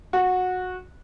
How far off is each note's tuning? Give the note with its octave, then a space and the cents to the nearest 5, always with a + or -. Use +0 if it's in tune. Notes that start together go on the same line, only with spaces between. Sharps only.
F#4 -15